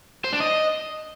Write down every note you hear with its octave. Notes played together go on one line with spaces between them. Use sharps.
C5
D4
D#5